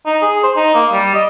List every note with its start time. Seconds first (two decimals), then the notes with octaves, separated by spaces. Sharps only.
0.06 D#4
0.22 G#4
0.43 C5
0.56 D#4
0.74 A#3
0.92 G3
1.14 D#5